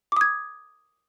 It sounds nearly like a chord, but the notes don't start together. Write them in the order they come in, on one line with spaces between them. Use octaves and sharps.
D6 D#6 G#6